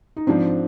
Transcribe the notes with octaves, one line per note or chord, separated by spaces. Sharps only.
D#4
G#2 F3 C4 D4